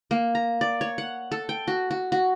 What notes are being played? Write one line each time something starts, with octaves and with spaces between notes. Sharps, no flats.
A#3
A#5
D5
C#5
F#5
A4
G5
F#4
F#4
F#4